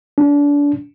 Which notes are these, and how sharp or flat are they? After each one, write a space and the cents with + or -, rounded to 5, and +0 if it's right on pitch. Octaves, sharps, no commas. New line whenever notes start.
D4 -30